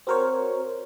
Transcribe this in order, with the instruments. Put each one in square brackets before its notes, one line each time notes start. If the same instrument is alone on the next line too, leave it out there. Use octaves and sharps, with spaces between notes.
[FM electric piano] C4 F#4 A#4 C5 C#5